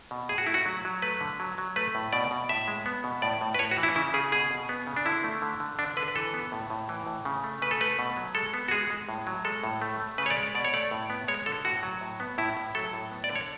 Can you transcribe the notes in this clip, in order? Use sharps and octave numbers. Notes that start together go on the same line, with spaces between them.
B2
A2 G#4
F#4
A3 E4
F#4
F#3
F#3
A3 B4
D3
F#3
F#3
A3 B4
A2
B2 D5
B2
A2 E5
G#3
B3
B2
A2 D5
A2
B4
A2 C#5
F#4
E3
E4
C#3 E4
C#3 G#4
B2 G#4
B2
B3
C#3
D4
D3 E4
A3
D3
D3
D3 D4
D3 B4
B4
E3 A4
B3
A2
A2
E3
A2
C#3
A3
C#3 B4
A4
A3 B4
B2
F#3
G#3 A4
B3
F#4
G#3 G#4
G#3
A2
F#3
G#3 A4
A2
A3
A3
C#3 B4
C#5
D5
G#3
D5
B2 D5
C#5
A3 D5
A2
B3
G#3 C#5
D3 A4
A2 F#4
F#3
A2
B3
A2 E4
A2
F#3 A4
A2
B3
D5
D3
C#5